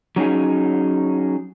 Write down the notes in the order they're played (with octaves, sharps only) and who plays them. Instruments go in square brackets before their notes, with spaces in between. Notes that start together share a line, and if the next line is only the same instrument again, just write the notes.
[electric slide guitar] F#3 C#4 D#4 G#4